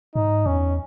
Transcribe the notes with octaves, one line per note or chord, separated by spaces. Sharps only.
G#2 D#4
E2 C#4